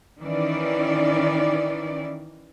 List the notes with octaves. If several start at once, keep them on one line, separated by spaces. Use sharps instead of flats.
D#3 E3 C#4 D5